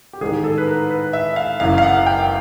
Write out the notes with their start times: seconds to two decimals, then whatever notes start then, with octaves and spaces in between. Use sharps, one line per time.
0.13 G4
0.21 A1 G#2 D#3 G#4
0.44 A4
0.58 B4
0.67 A#4
0.90 B4
1.13 E5
1.36 F5
1.60 F#1 F#2 C#3 E3 F5
1.78 F5
1.83 F#5
2.06 G5